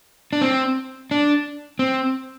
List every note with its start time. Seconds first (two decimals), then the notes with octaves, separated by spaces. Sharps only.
0.33 D4
0.41 C4
1.11 D4
1.79 C4